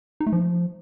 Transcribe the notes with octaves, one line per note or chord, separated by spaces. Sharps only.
D#4
A3
F3